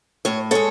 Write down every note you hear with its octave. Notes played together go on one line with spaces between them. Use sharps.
A2 C#5
G#3 A4 C#5